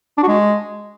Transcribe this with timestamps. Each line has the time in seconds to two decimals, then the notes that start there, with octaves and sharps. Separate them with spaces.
0.17 D4
0.23 F#4
0.28 G#3